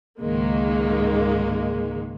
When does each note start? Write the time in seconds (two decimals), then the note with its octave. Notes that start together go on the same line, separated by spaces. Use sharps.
0.19 C#2 G#2 D#3 G#3 A#3